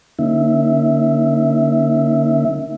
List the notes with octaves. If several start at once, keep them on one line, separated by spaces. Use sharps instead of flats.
D3 A#3 C#4 D#4 E5